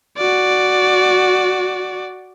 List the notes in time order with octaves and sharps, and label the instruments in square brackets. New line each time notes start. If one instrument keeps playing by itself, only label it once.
[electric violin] F#4 D5